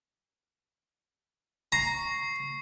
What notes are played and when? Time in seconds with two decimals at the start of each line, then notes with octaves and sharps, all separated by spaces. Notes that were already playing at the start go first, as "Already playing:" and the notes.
1.72 A#5 C#6 C7